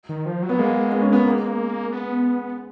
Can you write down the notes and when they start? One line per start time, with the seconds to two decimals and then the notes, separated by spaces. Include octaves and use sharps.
0.09 D#3
0.26 F3
0.42 F#3
0.49 B3
0.59 G#3 A#3
0.92 B3
1.02 C#4
1.13 B3
1.25 G#3 A#3
1.92 B3